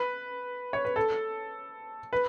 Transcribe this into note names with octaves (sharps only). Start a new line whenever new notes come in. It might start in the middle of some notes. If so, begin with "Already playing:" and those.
Already playing: B4
C#5
B4
A4
B4